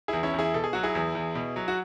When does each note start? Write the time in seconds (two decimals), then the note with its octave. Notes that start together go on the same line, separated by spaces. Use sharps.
0.08 E2 E4 G#4
0.23 C#4 E4
0.34 E2
0.39 E4 G#4
0.54 B2 A4
0.64 G#4
0.73 F#3 F#4
0.83 E4 G#4
0.95 E2
1.15 E2
1.35 B2
1.56 F#3
1.68 F#4